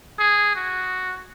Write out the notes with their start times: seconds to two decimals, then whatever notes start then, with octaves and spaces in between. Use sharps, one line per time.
0.19 G#4
0.55 F#4